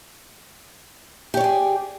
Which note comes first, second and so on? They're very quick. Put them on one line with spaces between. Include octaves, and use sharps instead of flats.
G4 C#5 D5 G#4